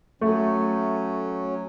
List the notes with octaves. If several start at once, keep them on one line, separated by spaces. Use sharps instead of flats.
F#3 A3 C#4